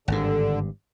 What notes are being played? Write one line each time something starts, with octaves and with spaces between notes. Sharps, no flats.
G#1 G2 D3